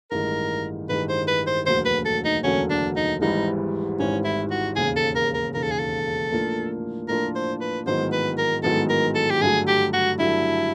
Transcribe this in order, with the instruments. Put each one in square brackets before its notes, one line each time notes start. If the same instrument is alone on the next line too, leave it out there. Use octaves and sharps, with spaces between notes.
[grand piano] A1 G2 D#3 G#3 [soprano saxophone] A#4
[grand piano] A1 G2 D#3 G#3 [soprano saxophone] B4
[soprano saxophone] C5
B4
C5
[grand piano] E1 D2 D3 F#3 A#3 [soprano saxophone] C5
[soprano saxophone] B4
A4
D#4
[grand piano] E1 D2 D3 F#3 A#3 [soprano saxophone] C#4
[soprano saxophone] D4
D#4
[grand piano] G#1 G#2 E3 G3 [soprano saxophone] D#4
[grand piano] G#1 G#2 E3 G3 [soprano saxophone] C#4
[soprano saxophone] E4
F#4
[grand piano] E1 D#2 C#3 [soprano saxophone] G#4
[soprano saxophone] A4
A#4
A#4
[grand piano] E1 D#2 C#3 [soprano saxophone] A#4
[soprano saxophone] A4
G#4
A4
[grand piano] A2 F3 A#3 D4 F4
[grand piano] A2 F3 A#3 D4 F4 [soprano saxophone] A#4
[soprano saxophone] C5
B4
[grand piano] A1 G#2 D#3 F#3 B3 [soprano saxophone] C5
[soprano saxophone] B4
A#4
[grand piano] A1 G#2 D#3 F#3 B3 [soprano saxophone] A4
[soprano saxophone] A#4
A4
G4
[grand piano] G2 D3 F#3 A3 [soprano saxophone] G#4
[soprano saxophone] G4
F#4
[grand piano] G2 D3 F#3 A3 [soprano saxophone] E4